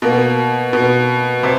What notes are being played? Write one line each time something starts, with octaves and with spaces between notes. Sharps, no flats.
B2 A#3
B2
C3